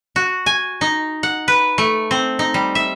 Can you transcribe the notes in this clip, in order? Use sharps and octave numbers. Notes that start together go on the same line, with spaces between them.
F#4
G#5
D#4
F#5
B4
A3
C4
D#4
G3
E5